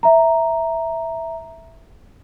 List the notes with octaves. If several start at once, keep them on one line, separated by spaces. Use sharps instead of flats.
E5 A#5